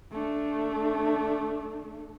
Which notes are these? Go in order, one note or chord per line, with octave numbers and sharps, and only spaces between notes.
A3 D4